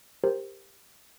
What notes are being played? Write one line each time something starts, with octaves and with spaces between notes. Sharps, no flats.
G4 A#4 C5